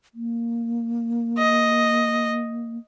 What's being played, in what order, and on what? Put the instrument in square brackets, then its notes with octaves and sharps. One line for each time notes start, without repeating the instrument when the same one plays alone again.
[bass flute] A#3
[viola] D#5